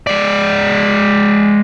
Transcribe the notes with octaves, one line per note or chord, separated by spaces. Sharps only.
G#3 D5